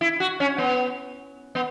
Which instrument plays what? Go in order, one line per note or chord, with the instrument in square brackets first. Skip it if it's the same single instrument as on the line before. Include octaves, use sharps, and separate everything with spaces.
[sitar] E4
F#4
C#4
B3
B3